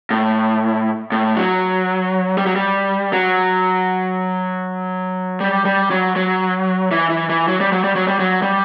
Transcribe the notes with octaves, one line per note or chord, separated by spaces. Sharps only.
A2
A2
F#3
G3
F#3
G3
F#3
G3
G3
F#3
F#3
E3
E3
E3
F#3
G3
F#3
G3
F#3
G3
F#3
G3